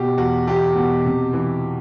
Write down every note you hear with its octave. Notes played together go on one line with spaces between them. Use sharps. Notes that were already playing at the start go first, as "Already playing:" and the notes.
Already playing: B2 G4
E2 F#4
E2 G4
B2
C3
E3